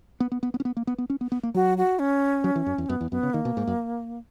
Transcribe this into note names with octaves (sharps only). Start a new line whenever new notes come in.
B3
B3
B3
B3
C#4
B3
A#3
B3
B3
C#4
B3
B3
A#3
F#3 F#4
F#4
C#4
F#3
E3
F#2
E2
F#2 B3
E2
F#2 B3
C#3
D#3 A#3
B2
G#2
F#2